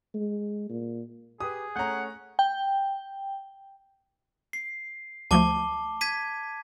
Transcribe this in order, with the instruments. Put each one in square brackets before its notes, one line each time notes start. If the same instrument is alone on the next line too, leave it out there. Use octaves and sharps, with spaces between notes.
[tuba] G#3
A#2
[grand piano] G4 B4 [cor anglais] G#4 [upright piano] D#6
[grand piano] A3 C#4 [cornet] F#5 [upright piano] A#5 G6
[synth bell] G5
[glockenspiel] C7
[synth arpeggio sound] D2 F3 A3 [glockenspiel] A5 D6 G7
[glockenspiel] G#6 B6 D#7